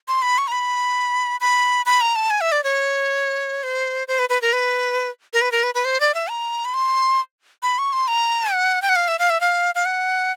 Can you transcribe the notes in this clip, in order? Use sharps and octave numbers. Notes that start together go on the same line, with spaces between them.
C6
B5
C#6
A#5
B5
B5
B5
A#5
A5
G#5
E5
D5
C#5
C5
C5
B4
B4
A#4
B4
A#4
B4
A#4
B4
B4
C5
D5
E5
A#5
B5
C6
B5
C#6
C6
A#5
F#5
G5
F#5
F5
E5
F5
E5
F5
F5
F#5